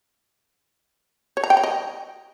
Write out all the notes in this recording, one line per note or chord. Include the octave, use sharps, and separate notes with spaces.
C#5
A#5
G5
A#5
D#5